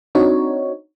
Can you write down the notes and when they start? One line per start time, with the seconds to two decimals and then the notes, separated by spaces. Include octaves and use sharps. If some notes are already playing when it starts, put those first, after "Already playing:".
0.15 C4 D4 D#4 F#4 C#5